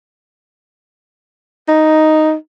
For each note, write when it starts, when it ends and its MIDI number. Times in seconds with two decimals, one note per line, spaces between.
1.68 2.34 63